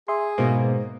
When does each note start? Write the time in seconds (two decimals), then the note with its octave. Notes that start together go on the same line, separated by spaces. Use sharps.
0.08 G#4 E5 C6
0.38 G#2 B2 A#3 C5